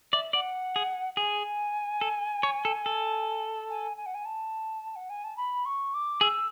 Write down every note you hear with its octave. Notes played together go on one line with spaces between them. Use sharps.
D5 E5
D5 F#5
G#4
G#4 G#5
A4
C#5
A4
A4
G#5
G#5
F#5
G#5
A5
F#5
G#5
A5
B5
C#6
D6
G#4 E6